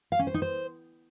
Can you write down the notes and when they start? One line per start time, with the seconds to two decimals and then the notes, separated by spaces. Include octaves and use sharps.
0.12 F5
0.19 C#4
0.27 C5
0.34 D#4
0.42 C5